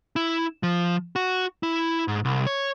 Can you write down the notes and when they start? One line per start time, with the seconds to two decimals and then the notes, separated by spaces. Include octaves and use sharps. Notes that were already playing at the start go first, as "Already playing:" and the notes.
0.16 E4
0.63 F3
1.16 F#4
1.63 E4
2.08 G#2
2.25 C2
2.47 C#5